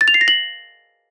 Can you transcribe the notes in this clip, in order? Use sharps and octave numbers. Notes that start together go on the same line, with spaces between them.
A6
F7
C7
A#6
F#7